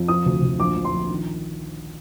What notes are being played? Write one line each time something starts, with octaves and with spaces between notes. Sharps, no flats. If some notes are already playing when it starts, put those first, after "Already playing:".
Already playing: F2
F3 D#6
D2
D2
A#1 D6
A#1
C6
A#1
D#3